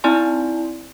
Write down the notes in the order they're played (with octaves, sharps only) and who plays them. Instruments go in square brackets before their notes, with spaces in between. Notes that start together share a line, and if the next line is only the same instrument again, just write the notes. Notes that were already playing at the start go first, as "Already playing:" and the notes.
[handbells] C4 D#4 E4 D5 G#5 C6